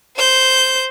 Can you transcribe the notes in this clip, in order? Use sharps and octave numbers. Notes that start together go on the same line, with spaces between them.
C5 G6